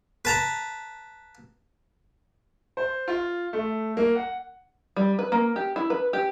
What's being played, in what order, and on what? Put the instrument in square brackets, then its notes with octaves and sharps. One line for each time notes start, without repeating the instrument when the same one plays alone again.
[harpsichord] B4 A5 A#5
[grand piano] C5
F4
A3
A#3
F#5
[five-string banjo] G3
B4
A#3
G4
E4
B4
G4